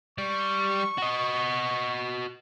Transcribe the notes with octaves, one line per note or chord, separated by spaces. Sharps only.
G3 D5 C#6
F#4 D#5